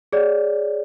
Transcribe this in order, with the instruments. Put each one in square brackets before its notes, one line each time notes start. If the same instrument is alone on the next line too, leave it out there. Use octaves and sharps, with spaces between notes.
[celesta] G#4 C#5 D5